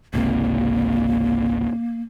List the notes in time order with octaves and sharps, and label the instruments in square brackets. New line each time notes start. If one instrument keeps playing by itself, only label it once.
[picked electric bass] G#1 C#2 C3 [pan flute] A#3